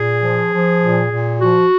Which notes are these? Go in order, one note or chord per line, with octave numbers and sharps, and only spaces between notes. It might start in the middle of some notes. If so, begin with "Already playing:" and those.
Already playing: A#2 G#4
F3
F3
A#2
A#2
F3 F#4